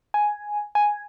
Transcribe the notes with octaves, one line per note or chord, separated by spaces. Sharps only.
G#5
G#5